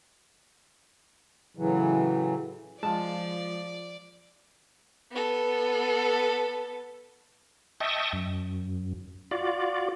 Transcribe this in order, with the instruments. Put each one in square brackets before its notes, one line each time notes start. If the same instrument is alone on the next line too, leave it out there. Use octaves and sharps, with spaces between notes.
[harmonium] A2 C#3 E3 F#3
[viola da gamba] F3 [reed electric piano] G#3 F4 [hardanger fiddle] D5 [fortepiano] A5
[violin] B3 A4
[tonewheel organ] D#5 E5 G5 A5 C#6 D#6
F#2
F4 F#4 D5